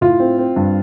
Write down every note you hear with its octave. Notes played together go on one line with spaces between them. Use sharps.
A2 F4
C4
C4
G2